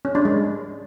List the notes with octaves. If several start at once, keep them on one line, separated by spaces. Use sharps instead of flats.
C#4
D4
G#3